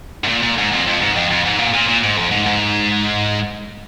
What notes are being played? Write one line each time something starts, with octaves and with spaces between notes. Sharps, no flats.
G#2
A#2
A#2
G#2
F2
F2
G#2
F2
F2
G#2
A#2
A#2
A#2
G#2
F2
G#2
G#2